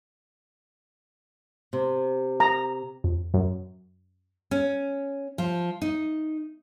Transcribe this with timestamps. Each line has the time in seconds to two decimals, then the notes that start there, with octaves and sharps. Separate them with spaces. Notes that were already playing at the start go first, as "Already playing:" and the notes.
1.73 C3
2.40 A#5
3.04 F2
3.34 F#2
4.51 C#4
5.38 F3
5.82 D#4